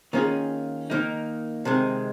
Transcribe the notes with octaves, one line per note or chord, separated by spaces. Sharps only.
D#3 A#3 C#4 F4 G#4
D#3 A#3 D#4
C3 D#3 G#3